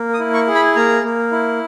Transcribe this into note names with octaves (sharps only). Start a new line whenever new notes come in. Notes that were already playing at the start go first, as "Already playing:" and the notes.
Already playing: A#3
D#6
E4
C#6
G#4
B5
A#3 A#5
A#3
E4